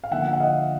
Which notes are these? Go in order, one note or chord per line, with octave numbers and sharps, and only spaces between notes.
F5
D3 F3 A#3 E5 F#5
F#5
D#5 F5